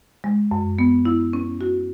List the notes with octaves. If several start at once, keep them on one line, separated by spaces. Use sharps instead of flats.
G#3
F#2
B3
E4
C#4
F#4